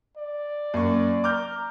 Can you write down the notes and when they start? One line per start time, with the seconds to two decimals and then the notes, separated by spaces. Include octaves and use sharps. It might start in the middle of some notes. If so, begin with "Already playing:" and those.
0.17 D5
0.74 F#2 A#3 C#6
1.24 A#5 D6 F6 G6